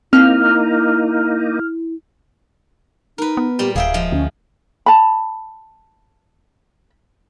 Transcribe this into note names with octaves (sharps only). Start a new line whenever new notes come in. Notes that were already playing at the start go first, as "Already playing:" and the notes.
A#3 C4 D#4 E4 F5 F6
D#4 A#4 B4
B3
A#2 G3 G4
D1 G#4 E5 F5 G5
F3 G#3
D2 C#4
A5 B5